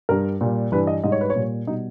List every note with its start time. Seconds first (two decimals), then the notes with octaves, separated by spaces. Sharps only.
0.09 G2 G3 A#4
0.41 A#2 G3
0.72 G2 E3 G3 B4
0.87 D#5
1.03 G#2 G3 D#5
1.12 C#5
1.21 B4
1.30 C#5
1.35 A#2 G3
1.67 B2 G3 D#4